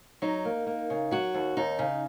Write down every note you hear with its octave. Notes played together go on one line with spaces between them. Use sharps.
F#3 D#4
A#3
A#3
C#3
F#3 F#4
D#2
D#2 D#4
C#3